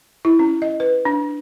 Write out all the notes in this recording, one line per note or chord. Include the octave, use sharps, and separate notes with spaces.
E4
C#4
D#5
B4
D4